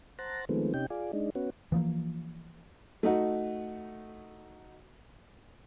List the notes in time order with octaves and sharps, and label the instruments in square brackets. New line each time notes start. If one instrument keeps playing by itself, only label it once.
[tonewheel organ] C5 F#5 A5 A#5
D#3 F3 G#3 A3 B3 C4
C3 C#4 D#4 G4 G5
F4 G#4 D5
G#3 D4 D#4
B3 C#4 F#4
[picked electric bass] E3 F3 A#3
[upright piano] A3 D#4 F#4